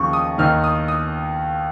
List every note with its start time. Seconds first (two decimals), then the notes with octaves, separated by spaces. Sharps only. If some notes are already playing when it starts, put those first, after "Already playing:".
Already playing: D#2 C#3 F3 C#6
0.13 D#6
0.38 D#2 D#3 F6
0.64 D#6
0.88 D#6